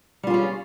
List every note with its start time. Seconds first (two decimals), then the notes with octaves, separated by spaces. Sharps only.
0.23 G3
0.27 F4
0.30 G#4
0.34 C#4